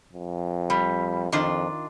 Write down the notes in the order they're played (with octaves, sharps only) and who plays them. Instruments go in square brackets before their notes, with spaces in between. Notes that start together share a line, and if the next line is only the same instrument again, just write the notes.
[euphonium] F2
[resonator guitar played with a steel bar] G3
[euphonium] F2 [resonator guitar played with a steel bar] D#3 D4 F4